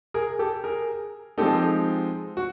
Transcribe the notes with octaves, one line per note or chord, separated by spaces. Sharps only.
G#4 A#4
G4 A4
G#4 A#4
F3 G#3 C4 D#4 G4 A4
F#4